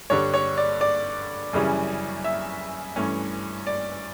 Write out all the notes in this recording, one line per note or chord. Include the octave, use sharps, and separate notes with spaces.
G2 D3 G3 C#5
C#5
D5
D5
F#2 C#3 E3 G3 C#4
E5
G2 E3 A3 C#4
D5